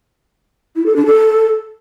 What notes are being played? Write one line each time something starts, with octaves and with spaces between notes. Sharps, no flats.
E4
A4
D4
A4